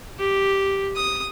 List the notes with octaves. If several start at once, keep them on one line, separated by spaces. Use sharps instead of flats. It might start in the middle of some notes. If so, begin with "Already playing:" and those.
G4
D#6